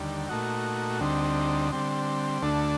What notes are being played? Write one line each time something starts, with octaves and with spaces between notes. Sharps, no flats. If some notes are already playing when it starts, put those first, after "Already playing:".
Already playing: D#2 D3 G3
A#2 A3 D#4 F#4
D2 D3 G3 C4 D#4
D3 G3 C4
D2 D3 A3 D4